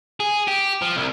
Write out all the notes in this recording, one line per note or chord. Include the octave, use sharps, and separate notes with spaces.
G#4
G4
F3
C2